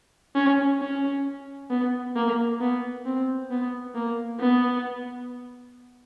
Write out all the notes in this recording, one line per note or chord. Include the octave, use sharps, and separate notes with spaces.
C#4
C#4
B3
A#3
B3
C4
B3
A#3
B3